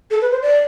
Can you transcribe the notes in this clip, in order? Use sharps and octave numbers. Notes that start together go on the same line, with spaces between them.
A4
B4
C5
D5